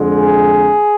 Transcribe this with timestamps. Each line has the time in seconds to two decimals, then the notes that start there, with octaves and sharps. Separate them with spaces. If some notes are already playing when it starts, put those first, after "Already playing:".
Already playing: F2 D3 G#3
0.15 G#4